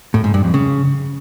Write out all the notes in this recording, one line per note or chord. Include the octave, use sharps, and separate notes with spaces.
A2
G#2
G2
F2
C#3